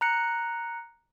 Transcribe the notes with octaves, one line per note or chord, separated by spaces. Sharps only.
A#5 F#6 C#7